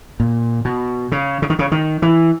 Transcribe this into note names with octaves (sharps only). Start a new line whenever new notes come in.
A#2
B2
C#3
C#3
D#3
C#3
D#3
E3